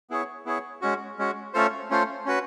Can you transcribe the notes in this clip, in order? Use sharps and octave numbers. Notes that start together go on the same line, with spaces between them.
B3 E4 G#4 C#5
B3 E4 G#4 C#5
G#3 C#4 F#4
G#3 C#4 F#4
A3 C#4 F4 A4 C5
A3 C#4 F4 A4 C5
C#4 F#4 B4